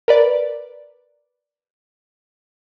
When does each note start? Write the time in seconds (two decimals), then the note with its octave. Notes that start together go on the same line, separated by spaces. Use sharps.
0.08 A#4 B4 D5